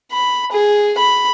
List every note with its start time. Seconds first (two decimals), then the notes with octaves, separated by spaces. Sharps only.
0.11 B5
0.52 G#4
0.98 B5